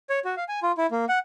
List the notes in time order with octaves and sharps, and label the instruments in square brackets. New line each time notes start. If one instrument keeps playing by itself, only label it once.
[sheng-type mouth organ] C#5
F#4
F5
G#5
F4
E4
A#3
F#5